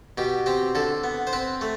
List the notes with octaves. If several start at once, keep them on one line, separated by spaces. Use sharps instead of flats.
B2 G4
C4 G4
D3 A4
B3
C5
C4 B4
A3